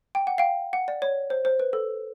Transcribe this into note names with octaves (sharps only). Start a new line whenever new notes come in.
G5
F#5
F5 G5
F#5
D5
C#5
C5
C5
B4
A4